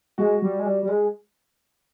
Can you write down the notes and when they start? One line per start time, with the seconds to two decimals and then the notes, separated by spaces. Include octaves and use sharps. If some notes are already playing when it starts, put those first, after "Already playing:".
0.18 G#3 F#4
0.42 G3
0.59 G#3
0.66 G3
0.83 G3
0.89 G#3